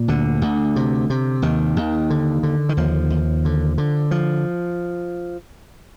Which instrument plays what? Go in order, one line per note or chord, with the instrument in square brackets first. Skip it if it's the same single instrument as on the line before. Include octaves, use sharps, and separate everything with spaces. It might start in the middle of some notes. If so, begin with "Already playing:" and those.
Already playing: [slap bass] A#2
D2 D3
D2
C3
C3
D#2 D#3
D#2
D3
D3
D#3
D#2 F3
D#2
D3
D3
F3